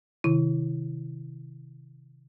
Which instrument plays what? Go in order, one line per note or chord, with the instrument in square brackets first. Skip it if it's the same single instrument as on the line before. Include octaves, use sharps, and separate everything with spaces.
[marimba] C3 D#3 E4